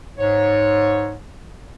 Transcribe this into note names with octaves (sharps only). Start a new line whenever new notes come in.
G#2 C#5